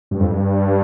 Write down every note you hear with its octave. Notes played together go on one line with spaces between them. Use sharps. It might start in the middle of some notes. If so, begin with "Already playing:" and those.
G2
F2
G2